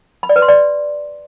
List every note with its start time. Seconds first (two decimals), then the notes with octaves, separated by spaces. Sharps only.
0.23 B5
0.29 D5
0.36 B4
0.42 C6
0.48 D5